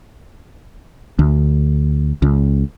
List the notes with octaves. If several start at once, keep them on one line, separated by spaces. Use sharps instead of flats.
D2
C#2